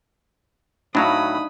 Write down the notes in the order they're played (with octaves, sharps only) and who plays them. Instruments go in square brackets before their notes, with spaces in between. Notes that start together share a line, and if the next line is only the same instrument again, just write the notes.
[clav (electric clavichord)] A2 F#3 [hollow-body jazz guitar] D4 D#4 F5 [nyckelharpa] B5 D#6